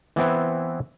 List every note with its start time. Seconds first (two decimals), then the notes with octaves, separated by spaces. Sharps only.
0.16 E3 B3 C4 E4